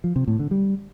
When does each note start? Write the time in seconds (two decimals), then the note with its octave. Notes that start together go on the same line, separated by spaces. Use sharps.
0.04 F3
0.16 C3
0.28 A2
0.39 D3
0.51 G3